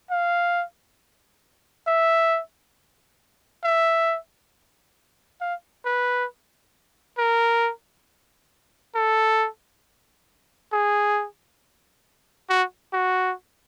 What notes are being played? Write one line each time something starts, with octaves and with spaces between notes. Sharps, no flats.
F5
E5
E5
F5
B4
A#4
A4
G#4
F#4
F#4